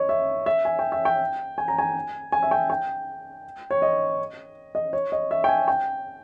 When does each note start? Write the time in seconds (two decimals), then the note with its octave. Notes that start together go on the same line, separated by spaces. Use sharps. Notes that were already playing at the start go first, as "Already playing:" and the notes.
Already playing: C#5 D#5
0.09 E5
0.46 E5
0.65 G#5
0.79 G5
0.92 E5
1.05 G5
1.58 G#5
1.68 A#5
1.78 G#5
2.32 G#5
2.43 E5
2.51 G5
2.70 G5
3.71 C#5
3.82 D#5
4.75 D#5
4.93 C#5
5.12 D#5
5.31 E5
5.44 G5
5.49 G#5
5.68 G5